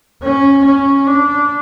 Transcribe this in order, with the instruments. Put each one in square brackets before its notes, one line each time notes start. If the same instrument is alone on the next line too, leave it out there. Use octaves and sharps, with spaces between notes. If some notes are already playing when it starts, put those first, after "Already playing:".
[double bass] C#4
C#4
D4